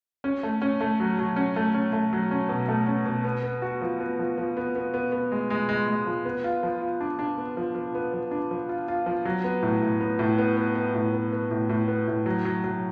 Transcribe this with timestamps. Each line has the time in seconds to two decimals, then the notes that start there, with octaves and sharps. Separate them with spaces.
0.24 C#4
0.43 A3
0.62 C#4
0.81 A3
1.00 F#3
1.19 F#3
1.36 C#4
1.56 A3
1.74 C#4
1.93 A3
2.13 F#3
2.31 C#4
2.49 B2
2.68 A3
2.87 C#4
3.06 B2
3.24 B3
3.43 B3
3.62 F#4
3.82 F3
4.00 B3
4.19 F3
4.38 F3
4.57 B3
4.76 B3
4.94 B3
5.12 B3
5.32 G#3
5.50 G#3
5.69 G#3
5.88 G#3
6.06 F3
6.25 B3
6.44 F4
6.63 F3
6.82 F4
7.01 D4
7.19 D4
7.38 B3
7.57 F3
7.75 F3
7.95 B3
8.13 F3
8.31 D4
8.51 F3
8.69 F4
8.88 F4
9.06 F3
9.25 F#3
9.44 B3
9.63 A2
9.81 A2
10.01 B3
10.19 A2
10.38 B3
10.57 B3
10.75 B3
10.95 A2
11.13 B3
11.32 B3
11.51 A2
11.69 A2
11.88 B3
12.07 A2
12.26 F#3
12.45 F#3
12.64 F#3